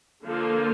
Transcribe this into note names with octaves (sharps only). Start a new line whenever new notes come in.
D3 F3 A#3 F4 A4